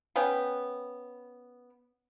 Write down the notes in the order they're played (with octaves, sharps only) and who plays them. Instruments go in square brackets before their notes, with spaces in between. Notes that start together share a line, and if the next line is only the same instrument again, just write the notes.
[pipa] B3 C#4 B4 G5